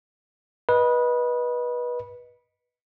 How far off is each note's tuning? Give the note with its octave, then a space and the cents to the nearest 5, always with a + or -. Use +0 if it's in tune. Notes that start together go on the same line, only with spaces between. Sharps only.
B4 -20 D#5 +0